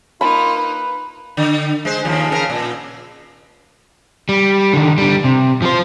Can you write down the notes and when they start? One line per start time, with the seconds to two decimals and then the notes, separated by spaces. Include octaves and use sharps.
0.21 A#3 D#4 F4 B5
0.56 B4
1.37 D3
1.85 G#3 C5
2.05 D#2 C#3 F3
2.30 C#3 A4 A#4
2.50 A#2
4.29 G3
4.73 D3 D#3
4.98 D3 G3
5.24 C3
5.62 F3 C5